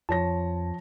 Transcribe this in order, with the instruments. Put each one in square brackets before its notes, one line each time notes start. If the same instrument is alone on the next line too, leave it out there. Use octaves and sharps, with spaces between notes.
[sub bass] F2 [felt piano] F3 C#5 A#6 [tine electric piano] A5